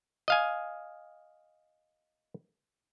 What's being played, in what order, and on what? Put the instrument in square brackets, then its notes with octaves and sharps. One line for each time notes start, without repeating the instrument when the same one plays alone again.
[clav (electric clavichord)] D#5 F5 G#5